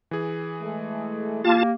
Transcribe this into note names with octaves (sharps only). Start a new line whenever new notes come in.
E3 G#4
G#3 A3
A#3 F4 G4 A5